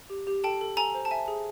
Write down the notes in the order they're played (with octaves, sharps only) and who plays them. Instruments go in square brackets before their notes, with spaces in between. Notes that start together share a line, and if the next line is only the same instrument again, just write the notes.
[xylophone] G4
G4
A4 G5 A5
A4
A4 G#5 A#5
C5
A5
E5 G#5
G#4